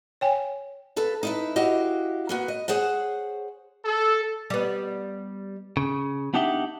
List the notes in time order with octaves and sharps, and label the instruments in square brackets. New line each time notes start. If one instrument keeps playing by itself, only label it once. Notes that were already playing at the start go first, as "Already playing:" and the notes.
[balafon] C#5 G5 G#5
[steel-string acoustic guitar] A4 B4 F5
D#4 E4 B4
E4 F#4 G4 D#5 F5
A#3 B3 F#4
D#5
G#4 C5 C#5 F#5
[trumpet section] A4
[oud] G3 B3
[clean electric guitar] C#3
B3 D4 D#4 G4 E5 F#5